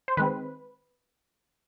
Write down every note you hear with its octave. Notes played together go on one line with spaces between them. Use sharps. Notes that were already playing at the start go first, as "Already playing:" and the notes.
C5
D#3 G#3 C4 B4